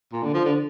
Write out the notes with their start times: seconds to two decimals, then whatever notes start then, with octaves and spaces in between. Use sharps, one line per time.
0.13 A#2
0.23 D3
0.34 F3
0.45 D3